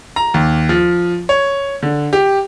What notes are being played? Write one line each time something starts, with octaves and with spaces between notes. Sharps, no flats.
A#5
D#2
F3
C#5
D3
G4